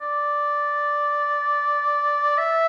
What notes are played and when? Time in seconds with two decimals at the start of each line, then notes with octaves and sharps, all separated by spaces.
0.01 D5
2.38 E5